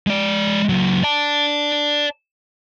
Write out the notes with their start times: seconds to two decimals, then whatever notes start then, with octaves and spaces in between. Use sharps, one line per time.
0.07 G#3 D5
0.69 C#2 F#3
1.03 D5 A5